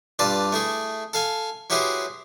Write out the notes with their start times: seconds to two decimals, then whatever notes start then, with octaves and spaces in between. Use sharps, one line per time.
0.19 G2 F4 B4 D5 A5
0.52 A3 E4 G#4
1.13 A4 F5 G#5
1.70 F#3 E4 G4 G#4 B4 C5